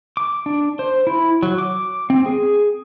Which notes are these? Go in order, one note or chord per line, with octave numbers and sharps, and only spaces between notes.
D6
D4
C5
E4
F#3
D6
C4
G#4